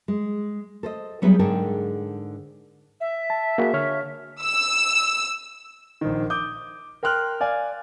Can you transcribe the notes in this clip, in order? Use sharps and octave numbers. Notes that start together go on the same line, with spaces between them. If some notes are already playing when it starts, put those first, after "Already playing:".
G#3
A4 C5 D#5
F#3 G3 B3 E4 G#4 B4
G#2 D3 G#4 A#4 G5 A5
E5
A5
A#3 F#4 G#4
D3 C#5 F6
E6
A#1 D#3
D6 D#6 G6
A#4 G5 C6 F6 F#6
D5 F5 G#5